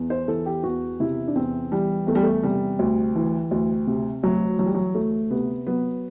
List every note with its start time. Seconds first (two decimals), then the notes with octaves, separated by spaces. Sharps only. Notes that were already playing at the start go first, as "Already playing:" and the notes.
Already playing: E2
0.10 C5
0.28 E3 A4
0.46 G4
0.63 E2 F#4
1.00 C3 E4
1.28 D4
1.35 E2 C4
1.71 E3 G3
2.07 E2 A3
2.15 G3
2.23 A3
2.43 C3 G3
2.79 D2
3.16 E3
3.51 D2
3.87 C3
4.23 D2 F#3
4.59 E3 F#3
4.66 G3
4.74 F#3
4.95 D2 A3
5.31 C3 B3
5.67 F#3 B3